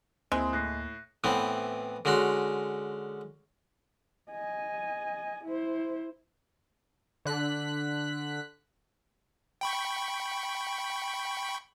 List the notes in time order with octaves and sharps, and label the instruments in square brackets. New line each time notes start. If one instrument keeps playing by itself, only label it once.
[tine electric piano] D2 A#3 [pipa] G#3 [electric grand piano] C4 E4 [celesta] C6 D#6 F#6
[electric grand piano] A2 [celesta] F#6 A#6 C7
[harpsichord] A2 E3 B3 C4
D3 G#3 C#4 F#4 A#5 C6
[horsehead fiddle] D#5 G#5
E4 C5
[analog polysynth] D3 F#6 B6
[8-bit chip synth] G5 B5 C#6